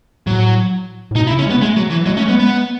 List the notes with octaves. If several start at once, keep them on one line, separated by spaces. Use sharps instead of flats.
A2 F#3
A2
B2 D#4
E4
C#3
C#4
G#3
B3
G#3 A3
F#3
E3
F#3 G#3
A3 C#4
G#3 B3
B3